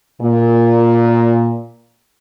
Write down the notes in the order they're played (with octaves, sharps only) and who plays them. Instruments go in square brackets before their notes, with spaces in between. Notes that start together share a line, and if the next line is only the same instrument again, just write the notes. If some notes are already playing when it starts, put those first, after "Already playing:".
[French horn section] A#2